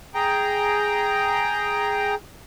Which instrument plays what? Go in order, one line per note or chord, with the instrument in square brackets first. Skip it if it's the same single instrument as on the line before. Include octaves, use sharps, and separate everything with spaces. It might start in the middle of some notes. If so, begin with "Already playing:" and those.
[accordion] G#4 G5 A#5